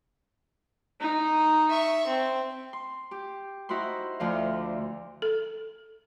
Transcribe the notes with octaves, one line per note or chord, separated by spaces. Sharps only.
D#4
E5 C#6
C4
C6
G4
D#4 E4 F#4 C5 C6
D2 D3 F3 F5
A4